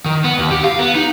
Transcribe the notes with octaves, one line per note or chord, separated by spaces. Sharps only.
D#3
B3
D#2
G4
F5
B3
D#4